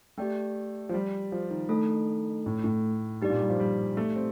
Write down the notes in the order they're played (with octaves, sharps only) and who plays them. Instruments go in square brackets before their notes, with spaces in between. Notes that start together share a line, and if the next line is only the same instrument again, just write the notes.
[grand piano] A3 [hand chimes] G4 D5 G5
[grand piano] F3
G3
F3
D#3
[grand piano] D#3 [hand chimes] A3 D4 A4
[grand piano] A2
A2
[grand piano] G2 [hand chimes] D#4 G4 D5
[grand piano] A#2
G3
F3
G3
A3
C4